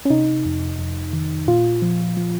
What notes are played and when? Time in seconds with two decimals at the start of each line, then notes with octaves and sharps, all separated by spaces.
0.05 C#4
0.10 C3 D#4
0.45 F2
0.79 F2
1.13 D#3
1.47 A#2 F4
1.82 F3
2.17 F3